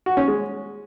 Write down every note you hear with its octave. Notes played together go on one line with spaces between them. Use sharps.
F#4
C#4
G#3